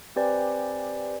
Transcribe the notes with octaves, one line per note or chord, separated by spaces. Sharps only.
C4 G4 B4 C5 D5 G#5